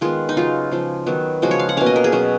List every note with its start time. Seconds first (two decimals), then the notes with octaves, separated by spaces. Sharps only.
0.01 D#3 G#3 B3 F4
0.29 D#4
0.36 C#3 F#3 C#4 F4
0.71 C#3 F3 G#3
1.06 D#3 F#3 B3
1.42 C#3 F3 G#3 F#4
1.51 C#5
1.59 F5
1.69 F#5
1.77 B2 A#3 C#4 F5
1.86 D#5
1.96 A#4
2.04 G#4
2.12 B2 F#3 C#4